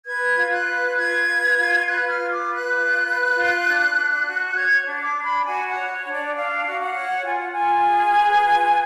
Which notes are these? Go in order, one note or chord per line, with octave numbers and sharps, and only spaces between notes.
B4 G#6
F4
F#6
B4
F4 G#6
B4
F4
B4 F#6
F6
F4
D6
B4
F#6
F4
B4
F4
D4
D4
F#4
C#5 G#6
D4
D6
D4
B5
F#4 G#5
F#5
C#5
C#5
D4
D5
D4 F5
F#4
F#5
C#5
F4 G#5
F#5
F4 G#5
G#4
B4
F4